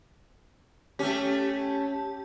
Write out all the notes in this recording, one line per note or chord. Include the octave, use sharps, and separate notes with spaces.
A3 C#4 G4